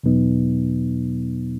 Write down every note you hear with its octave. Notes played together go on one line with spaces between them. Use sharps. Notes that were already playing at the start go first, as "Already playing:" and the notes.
E2 B2 F#3 B3 D#4